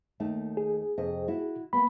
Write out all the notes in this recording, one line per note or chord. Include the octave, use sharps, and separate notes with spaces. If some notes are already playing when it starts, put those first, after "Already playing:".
D#2 A3 D#4
G#4
F2 C3 D#5
E4 F#4
A#3 B3 B5